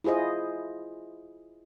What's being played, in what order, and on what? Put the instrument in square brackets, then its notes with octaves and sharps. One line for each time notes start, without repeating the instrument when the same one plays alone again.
[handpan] E4 F4 G#4 C5 D#5